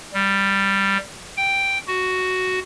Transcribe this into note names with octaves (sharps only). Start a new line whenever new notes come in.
G3
G5
F#4